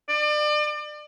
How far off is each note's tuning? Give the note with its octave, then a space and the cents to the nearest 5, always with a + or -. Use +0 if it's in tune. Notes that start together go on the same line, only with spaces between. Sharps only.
D5 +35